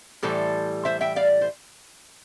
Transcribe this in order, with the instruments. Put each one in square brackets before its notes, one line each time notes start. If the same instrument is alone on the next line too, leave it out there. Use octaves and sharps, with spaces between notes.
[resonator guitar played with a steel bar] A2 E3 G3 A4 C5
C5 E5
E5 G5
D5 F5
C5